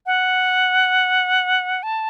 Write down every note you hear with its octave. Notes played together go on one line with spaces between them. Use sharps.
F#5
A5